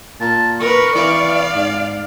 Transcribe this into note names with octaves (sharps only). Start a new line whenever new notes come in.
A#2 A5
A#4 B4 C#6
E3 D5 F5
G#2